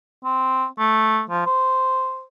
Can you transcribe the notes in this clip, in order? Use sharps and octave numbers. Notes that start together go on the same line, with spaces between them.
C4
A3
F3
C5